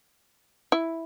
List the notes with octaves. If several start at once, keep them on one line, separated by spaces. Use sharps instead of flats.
E4